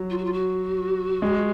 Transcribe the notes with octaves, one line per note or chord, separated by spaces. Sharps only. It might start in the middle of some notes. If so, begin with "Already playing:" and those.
Already playing: F#3
F4
F#4
F4
F#4
G#3